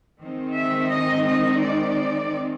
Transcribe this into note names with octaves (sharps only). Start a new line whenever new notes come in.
D#3 G#3 C4 D#4
E5
D#5
D#5
D5